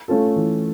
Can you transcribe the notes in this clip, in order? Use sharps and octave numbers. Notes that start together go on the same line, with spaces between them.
A3 C#4 F4 A4
E3